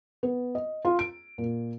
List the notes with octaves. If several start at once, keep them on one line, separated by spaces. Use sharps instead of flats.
B3
D#5
F4
D7
A#2